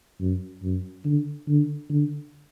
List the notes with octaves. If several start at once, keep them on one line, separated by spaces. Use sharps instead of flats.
F#2
F#2
D3
D3
D3